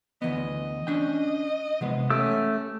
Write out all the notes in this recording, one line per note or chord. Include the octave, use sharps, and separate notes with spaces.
D2 E3 B3 D#5
C#4 D4 G5
C3 E3 G#3 B3
A3 C#4 G4 E6